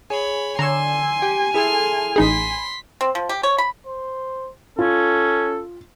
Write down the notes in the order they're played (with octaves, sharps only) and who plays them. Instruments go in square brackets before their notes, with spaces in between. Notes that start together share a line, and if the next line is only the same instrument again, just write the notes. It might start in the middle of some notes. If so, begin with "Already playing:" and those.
[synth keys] G#4 [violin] C#5 B5
[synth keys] D3 D5 E6 [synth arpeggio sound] C#5 A#5 [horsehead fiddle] G#5 [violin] C6
[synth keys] G4
[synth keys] E4 G#4 A4 [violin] C6 F6
[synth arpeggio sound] A1 D#4 G#4 [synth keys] B5 [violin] C6 B6
[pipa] C4
F3
G4
C#5
B5
[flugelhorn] C5
[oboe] C#4 [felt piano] F4 [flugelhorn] A4